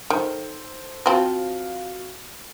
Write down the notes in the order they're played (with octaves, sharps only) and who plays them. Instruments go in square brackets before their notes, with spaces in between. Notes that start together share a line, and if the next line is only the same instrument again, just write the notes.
[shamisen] D#3 [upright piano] A4 C5
[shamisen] F3 C4 [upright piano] F#4 F5